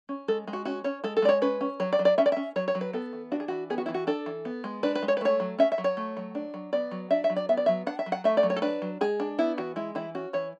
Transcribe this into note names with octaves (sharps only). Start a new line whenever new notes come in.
C#4
G#3 A4
G#3
F#4
C#4 F#4
C#4 C#5
G#3 A4
A4
G#3 D5
C#5
C#4 B4
C#4
F#3 C#5
D5
F#3
D5
C#4 E5
D5
C#4 E5
F#3 C#5
C#5
F#3
B4
B3 A4
E3
D4 F#4
G#4
E3 F#4
B3 G#4
F#4
E3 E4
F#4
D4 A4
E3
B3
G#3
D4 B4
B4
G#3
C#5
B4
A3 C#5
F#3
C#4 E5
E5
F#3
C#5
A3
F#3
D4
F#3
B3 D5
F#3
D4 E5
E5
F#3
D5
B3 E5
D5
F#3 E5
D4 F#5
E5
F#3
F#5
A3 E5
D5
F#3
C#5
A4
D4 B4
F#3
G#3 G#4
D4
B3 E4
E3 F#4
G#3 E4
E3 E4
C#4 F#4
E3 C#5